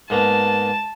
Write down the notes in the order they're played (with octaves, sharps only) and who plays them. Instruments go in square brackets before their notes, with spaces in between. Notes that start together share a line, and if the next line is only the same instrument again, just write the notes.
[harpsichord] G#2 A#3 B3 [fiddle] A5